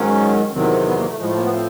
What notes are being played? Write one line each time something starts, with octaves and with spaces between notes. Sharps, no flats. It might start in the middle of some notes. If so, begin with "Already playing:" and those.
Already playing: G#2 D#3 F#3 C#4
E2 C3 D#3 F#3 C4
C4
B3
A#3
A3
A2 F3 G#3
A3
A#3
B3
C4